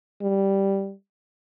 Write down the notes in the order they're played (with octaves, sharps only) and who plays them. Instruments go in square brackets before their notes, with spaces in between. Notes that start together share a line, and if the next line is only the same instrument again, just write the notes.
[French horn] G3